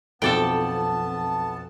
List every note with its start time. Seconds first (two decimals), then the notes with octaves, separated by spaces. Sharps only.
0.22 B1 F2 B3 A4 D5 G5 A5